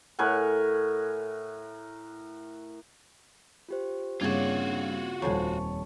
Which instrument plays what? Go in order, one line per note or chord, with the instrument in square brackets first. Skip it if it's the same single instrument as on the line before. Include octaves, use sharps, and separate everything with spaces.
[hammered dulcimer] A2 A#4 F#5 G#5
[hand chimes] F4 G4 C5
[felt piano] G2 [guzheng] C#3 D5 [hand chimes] A#3 C4 G#6 [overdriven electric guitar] F4 F#4
[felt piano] D#1 C#5 [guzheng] F2 C5 G#5 [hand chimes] A5 C#6